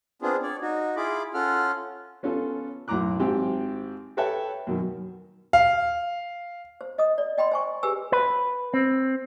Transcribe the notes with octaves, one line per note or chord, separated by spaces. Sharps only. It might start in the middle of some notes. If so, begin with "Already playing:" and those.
B3 C4 D4 F4 G#4
C#5 D5
D#4 F#4
E4 F4 G#4 B5 D6
C#4 F4 A4 F#5 F6
B3 C#4 F4 A4
B1 F#2 A2 A#5 D6 F#6
G#1 C4 G4
A4 B4 C#5 E5 G5 A5
F#2 B2 D#3
F5
C5
D#5 D#6
D5
D#5 G5 B5 C6
C5 G#5 C#6
G4 G#4 B4 G#5 E6
B4
C4